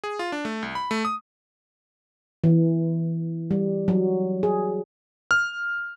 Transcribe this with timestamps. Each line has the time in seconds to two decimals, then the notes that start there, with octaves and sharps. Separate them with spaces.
0.04 G#4
0.19 F4
0.32 D4
0.45 A3
0.62 C2
0.75 B5
0.91 A3
1.05 D#6
2.44 E3
3.51 G3
3.88 F#3
4.43 G#4
5.31 F6